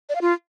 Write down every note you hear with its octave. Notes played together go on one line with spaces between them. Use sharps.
D5
F5
F4